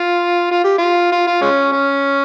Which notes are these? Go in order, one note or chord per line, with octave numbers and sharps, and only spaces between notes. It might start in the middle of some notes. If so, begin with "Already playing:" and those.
Already playing: F4
F4
G4
F4
F4
F4
G#3 C#4
C#4